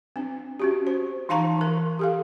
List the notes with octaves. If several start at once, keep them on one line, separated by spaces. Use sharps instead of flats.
C4 D4
C#4 F#4 G4
C5
E3 D#4 F5 A5 A#5 C#6
E3 A#4
G4 A4 F5